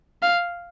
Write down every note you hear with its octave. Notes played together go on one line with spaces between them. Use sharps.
F5